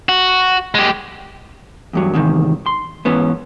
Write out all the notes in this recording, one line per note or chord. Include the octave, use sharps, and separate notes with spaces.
F#4
G#3 G4
E2 G2 F#3
E2 G#2 C3 D#3
C6
G#2 E3 B3 C#4